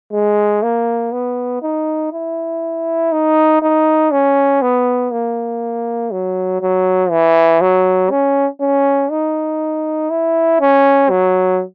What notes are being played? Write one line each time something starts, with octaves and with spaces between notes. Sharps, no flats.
G#3
A#3
B3
D#4
E4
D#4
D#4
C#4
B3
A#3
F#3
F#3
E3
F#3
C#4
C#4
D#4
E4
C#4
F#3